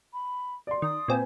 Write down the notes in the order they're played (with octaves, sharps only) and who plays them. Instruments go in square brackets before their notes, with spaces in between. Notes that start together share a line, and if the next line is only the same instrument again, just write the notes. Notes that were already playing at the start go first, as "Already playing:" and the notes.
[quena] B5
[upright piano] D5 C6
[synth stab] D#3 [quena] D#6
[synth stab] A#2 C4 [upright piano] B4 G#5